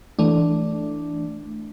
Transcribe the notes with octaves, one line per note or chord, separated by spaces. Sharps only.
E3 A3 D4